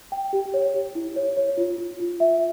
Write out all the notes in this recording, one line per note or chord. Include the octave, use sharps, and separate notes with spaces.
G5
G4
C#5
G4
E4
C#5
C#5
F4
F4
F4
E5